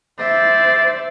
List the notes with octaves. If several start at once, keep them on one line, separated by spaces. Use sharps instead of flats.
C5 D5 E5